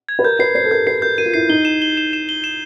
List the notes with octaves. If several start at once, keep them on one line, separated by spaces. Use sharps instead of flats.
G#6
B4
A#4 G6
B4 C7
C5 C7
A4
A#4 G6
B4 C7
A#4 G6
A#4 D#7
F4
E4 C7
D#4 G7
E7
G7
E7
E7
G7
E7